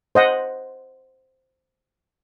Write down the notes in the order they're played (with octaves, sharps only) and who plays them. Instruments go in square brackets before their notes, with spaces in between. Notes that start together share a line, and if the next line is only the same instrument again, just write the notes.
[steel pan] C5 D#5 F#5